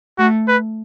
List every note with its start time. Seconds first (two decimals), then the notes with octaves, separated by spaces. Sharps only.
0.18 A3 F#4
0.48 B4